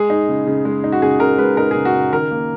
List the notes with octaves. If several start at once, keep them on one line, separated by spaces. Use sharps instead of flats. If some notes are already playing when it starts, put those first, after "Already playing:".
Already playing: G#3 G#4
D#4
C#3
C#3
G#3
D#4
F#4
C#3 G#4
C#3 A#4
G#3 B4
D#4 A#4
G#4
C#3
F#4
C#3
D#3 A#4
A#3